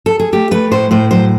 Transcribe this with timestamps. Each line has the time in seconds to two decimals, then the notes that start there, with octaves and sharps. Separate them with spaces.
0.06 A4
0.19 G#4
0.32 A3 G4
0.51 A3 B4
0.71 A2 C5
0.91 A2 C5
1.11 F#3 C5